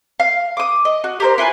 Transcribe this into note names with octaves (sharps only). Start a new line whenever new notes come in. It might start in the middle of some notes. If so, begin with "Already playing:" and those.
F5
D6 D#6
D#5
F#4
G4 A#4 C5
E4 F4 B4 G#5